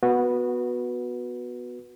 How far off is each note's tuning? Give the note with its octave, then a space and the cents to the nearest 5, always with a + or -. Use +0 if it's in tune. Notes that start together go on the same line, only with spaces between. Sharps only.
B3 +0 F#4 -15 B4 -15